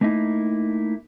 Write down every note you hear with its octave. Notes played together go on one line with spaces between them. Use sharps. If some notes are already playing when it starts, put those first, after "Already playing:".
A3 A#3 D#4 E4